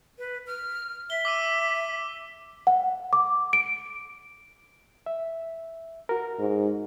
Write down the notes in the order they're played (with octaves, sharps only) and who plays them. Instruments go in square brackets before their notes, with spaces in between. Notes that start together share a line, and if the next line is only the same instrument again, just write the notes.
[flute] B4
F6
[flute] E5 [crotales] G7
[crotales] D6 E6 D#7
[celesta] F#5
D6
D7
[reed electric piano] E5
F#4 A#4
[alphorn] G#2